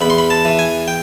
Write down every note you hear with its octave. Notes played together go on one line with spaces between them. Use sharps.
E2 B5
C6
B5
A5
E3
G#5
G5